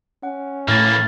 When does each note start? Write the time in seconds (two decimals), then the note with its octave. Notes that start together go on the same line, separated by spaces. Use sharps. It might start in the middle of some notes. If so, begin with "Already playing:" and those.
0.23 C#4 F#5
0.68 A2 E3 A#3 F6 G#6 A6